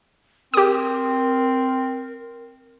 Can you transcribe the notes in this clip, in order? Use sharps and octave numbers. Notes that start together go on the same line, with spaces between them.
C4 G4 A#4 D#6